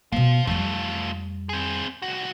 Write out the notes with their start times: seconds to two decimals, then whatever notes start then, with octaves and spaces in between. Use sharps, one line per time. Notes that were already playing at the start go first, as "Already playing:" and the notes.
0.12 B2 B3 C5 F5
0.47 F2 G3 A3 F4
1.49 C4 G#4
2.02 C2 F#4